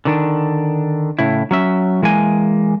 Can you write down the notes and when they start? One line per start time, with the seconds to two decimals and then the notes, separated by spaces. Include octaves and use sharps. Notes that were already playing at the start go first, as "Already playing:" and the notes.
0.05 D3 D#3 D4
1.19 A2 C#3 E4
1.51 F#3 C#4 E5
2.02 E3 G#3 A#3 G#5